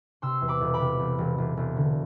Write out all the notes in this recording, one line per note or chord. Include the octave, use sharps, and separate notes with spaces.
C3 C6 E6
E2
B5 D6
E1
B5 D6
C3
E1
E1
E1
E1
D3